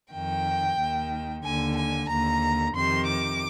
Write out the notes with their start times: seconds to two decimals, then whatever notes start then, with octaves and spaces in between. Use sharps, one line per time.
0.13 F2 D#3 G5
0.78 D#2 D#3
1.44 D#2 D3 G#5
1.76 G#5
2.09 D#2 D3 A#5
2.75 F2 C3 D#3 C6
3.08 D6